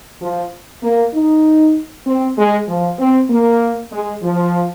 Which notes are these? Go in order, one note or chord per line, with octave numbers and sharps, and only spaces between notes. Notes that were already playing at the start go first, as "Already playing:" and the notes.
F3
A#3
D#4
C4
G#3
F3
C4
A#3
G#3
F3